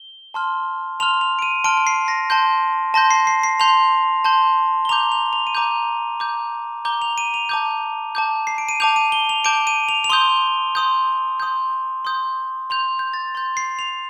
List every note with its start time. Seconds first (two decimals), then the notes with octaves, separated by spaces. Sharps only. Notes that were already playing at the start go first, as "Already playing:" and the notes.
Already playing: G7
0.34 A5 C6 F6
1.00 A5 C6 F6 F7
1.21 F7
1.39 D7
1.42 D#7
1.64 A5 C6 F6 D7
1.77 D7
1.87 C7
2.08 A#6
2.30 A5 C6 G6
2.94 A5 C6 G6 A#6
3.11 C7
3.27 C7
3.43 C7
3.60 A5 C6 G6 F7
4.24 A5 C6 G6
4.85 G7
4.89 A#5 D6 G6 F7
5.12 F7
5.33 F7
5.47 D#7
5.55 A#5 D6 G6 F7
6.20 A#5 D6 G6
6.85 A#5 D6 G6 G7
7.02 F7
7.18 D#7
7.34 F7
7.49 A5 D6 G6
8.15 A5 D6 G6
8.47 C7
8.58 D7
8.69 D#7
8.80 A5 D6 G6 F7
8.96 D#7
9.12 G7
9.29 F7
9.45 A5 D6 G6 D7
9.67 D#7
9.89 F7
10.04 F7
10.10 C6 D#6 G6 G7
10.75 C6 D#6 G6
11.40 C6 D#6 G6
12.05 C6 D#6 G6
12.70 C6 G6 F7
12.99 G6
13.13 A6
13.35 C6 G6
13.57 C7
13.79 F7